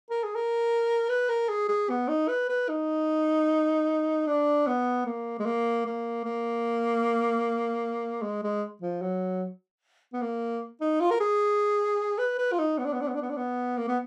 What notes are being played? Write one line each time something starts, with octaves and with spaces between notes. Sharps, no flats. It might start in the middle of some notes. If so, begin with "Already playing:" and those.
A#4
G#4
A#4
B4
A#4
G#4
G#4
B3
D#4
B4
B4
D#4
D4
B3
A#3
G#3
A#3
A#3
A#3
G#3
G#3
F3
F#3
B3
A#3
D#4
F4
A#4
G#4
B4
B4
F4
D#4
B3
D4
B3
D4
B3
D4
B3
D4
B3
A#3
B3